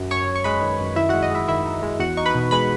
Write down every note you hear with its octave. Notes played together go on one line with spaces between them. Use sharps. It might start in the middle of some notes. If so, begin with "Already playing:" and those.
Already playing: F#2
F#2 C#5 C#6
F#2
C#6
G#3 B4 B5
D#3
F#2
D#3 E4 E5
G#3 F#4 F#5
D#5
G#3 E4 E5
D#3 E4 E5
D#4
G#3
E2 F#4 F#5
D#4 C#6
B4 B5
B2
G#3 B4 B5